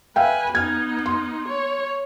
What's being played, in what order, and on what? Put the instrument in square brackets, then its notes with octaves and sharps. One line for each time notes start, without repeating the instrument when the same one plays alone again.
[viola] B4 G#5 [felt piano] E5 F5 G5
[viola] B3 D#4 [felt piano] F6 G#6
[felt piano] C6
[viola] C#5